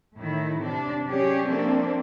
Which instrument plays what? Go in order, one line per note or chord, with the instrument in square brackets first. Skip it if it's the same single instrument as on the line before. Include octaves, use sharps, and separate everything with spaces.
[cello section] A2 D#3 A3 E4
C3 D4
F#3 C#4 G4 G#4 C#5 D5
F3 A3 A#3 C4 D4